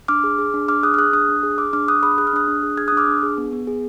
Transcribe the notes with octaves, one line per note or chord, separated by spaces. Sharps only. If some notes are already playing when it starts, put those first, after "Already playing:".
D4 D6 F6
G#4
G#4
D4
D4 D6 F6
G#4 D#6 F#6
F6
G#4 D#6 F#6
D4 D#6 F#6
D4
G#4
G#4 D6 F6
D4 D6 F6
D4 D#6 F#6
G#4 B5 D#6
G#4 F#6
F6
D4 D#6 F#6
D4
G#4
G#4 F6 G#6
D4 D#6 F#6
D6 F6
D4
G#4
B3
B3
G#4